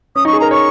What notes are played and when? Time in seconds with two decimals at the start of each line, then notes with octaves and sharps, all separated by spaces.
0.16 C#4 D#6
0.25 D#4 C#6
0.33 G#4
0.40 A#4 A#5
0.51 C#5 C#6